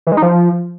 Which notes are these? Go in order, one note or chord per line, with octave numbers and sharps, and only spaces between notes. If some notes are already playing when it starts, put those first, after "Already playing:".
E3
G#3
D#4
F3